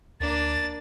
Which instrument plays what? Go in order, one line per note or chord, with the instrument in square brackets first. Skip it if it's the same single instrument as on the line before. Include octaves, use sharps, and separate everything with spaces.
[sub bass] D2 [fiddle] A#3 D4 [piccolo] A6